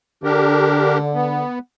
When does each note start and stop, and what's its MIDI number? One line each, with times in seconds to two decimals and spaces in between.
0.24 1.43 50
0.24 0.98 62
0.24 0.98 67
0.24 0.98 70
1.14 1.59 59